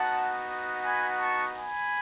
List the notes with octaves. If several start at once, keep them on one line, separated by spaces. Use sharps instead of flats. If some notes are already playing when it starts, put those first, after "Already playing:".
Already playing: B3 D#4 F#4 F#5 A5
G#5 B5
A5 C#6
G#5 B5